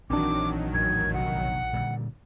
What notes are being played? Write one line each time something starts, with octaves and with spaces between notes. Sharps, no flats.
A#1 D#3 E3 F#3 C4 D4 D6
A1 E2 A2 G#6
F1 B1 B2 F#5
A#2 D3 G3